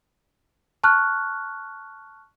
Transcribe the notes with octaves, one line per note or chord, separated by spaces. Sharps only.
A5 C#6 F6 F#6